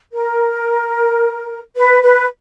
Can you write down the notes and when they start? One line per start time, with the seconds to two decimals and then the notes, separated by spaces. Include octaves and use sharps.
0.12 A#4
1.76 B4
2.02 B4